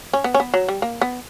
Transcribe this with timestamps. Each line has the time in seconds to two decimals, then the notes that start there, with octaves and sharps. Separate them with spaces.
0.13 C#4
0.24 B3
0.35 C#4
0.40 B3
0.54 F#3
0.68 G3
0.82 A#3
1.01 B3